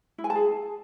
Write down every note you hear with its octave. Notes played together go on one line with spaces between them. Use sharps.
E4
G#5
A5
G#4